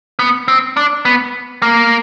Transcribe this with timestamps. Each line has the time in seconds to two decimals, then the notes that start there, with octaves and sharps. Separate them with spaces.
0.19 B3
0.48 C4
0.77 D4
1.05 B3
1.62 A#3